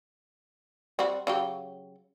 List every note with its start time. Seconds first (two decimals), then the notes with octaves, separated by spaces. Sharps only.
0.99 G3 C4 F#4
1.27 C#3 F#3 G4